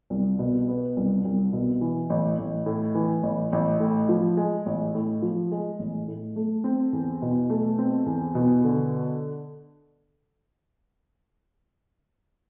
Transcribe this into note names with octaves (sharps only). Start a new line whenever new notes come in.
C2
B2
B3
C2
C2
B2
E3
A1
A1
A2
E3
A1
A1
A2
F3
G#3
A1
A2
F3
G#3
A1
A2
A3
C4
E2
B2
A3
C4
E2
B2
D3